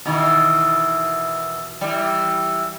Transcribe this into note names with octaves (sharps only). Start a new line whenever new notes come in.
B2 D#3 E3
E3 G3